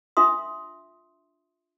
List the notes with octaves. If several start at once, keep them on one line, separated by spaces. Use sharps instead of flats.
D4 F4 E5 C6 D#6